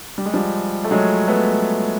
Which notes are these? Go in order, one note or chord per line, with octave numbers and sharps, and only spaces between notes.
G3
G#3
F3 G3
A3
F#3 G#3
A3 B3